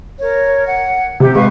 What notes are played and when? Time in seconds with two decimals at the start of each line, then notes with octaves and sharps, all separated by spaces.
0.20 A#4 C#5
0.67 F#5
1.20 C3 G4
1.35 G#3 B4 F5 C#6